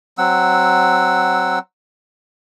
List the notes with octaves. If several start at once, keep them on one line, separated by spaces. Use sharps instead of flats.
F#3 C4 F#5 E6